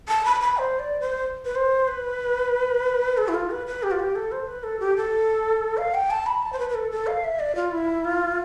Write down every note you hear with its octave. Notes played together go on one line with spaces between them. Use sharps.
A5
B5
B5
C5
D5
C5
B4
C5
B4
A4
E4
F4
B4
B4
G4
F4
G4
A4
C5
B4
A4
G4
A4
F5
G5
A5
B5
A5
C5
B4
B4
A4
A4
F5
E5
D5
F4
E4
F4